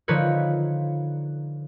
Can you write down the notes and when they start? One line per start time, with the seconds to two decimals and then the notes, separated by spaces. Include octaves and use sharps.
0.08 D3 F3 D#4 B4 C#5